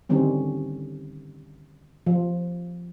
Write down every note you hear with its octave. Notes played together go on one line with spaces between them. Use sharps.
D3 D#3 G3 C4 C#4
F3